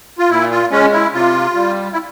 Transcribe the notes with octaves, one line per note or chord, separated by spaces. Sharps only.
F4
A#2 E4
F4
G#3 C#4
E4
C3 F4
G3
E4